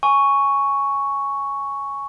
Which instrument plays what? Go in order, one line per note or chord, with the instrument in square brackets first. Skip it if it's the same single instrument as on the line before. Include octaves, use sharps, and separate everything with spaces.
[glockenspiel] G#5 C#6